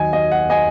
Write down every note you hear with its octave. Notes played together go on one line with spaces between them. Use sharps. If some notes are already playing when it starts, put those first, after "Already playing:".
Already playing: D#2 D#3 F#3 D#5 G#5
D#5
F#5
D#5 G#5